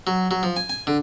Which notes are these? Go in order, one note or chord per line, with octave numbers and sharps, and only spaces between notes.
F#3
F#3
F3
G#5
G#5
D3